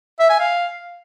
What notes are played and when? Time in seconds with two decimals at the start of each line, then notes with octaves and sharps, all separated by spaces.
0.19 E5
0.29 G#5
0.40 F5